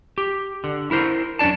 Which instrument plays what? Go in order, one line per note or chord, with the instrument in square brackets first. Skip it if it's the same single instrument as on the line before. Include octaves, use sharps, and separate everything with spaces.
[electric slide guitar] G4
D3
E4 A#4 C5
F#2 C#4 D4 D5 A5